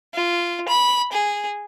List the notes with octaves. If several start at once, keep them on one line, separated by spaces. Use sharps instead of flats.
F4
B5
G#4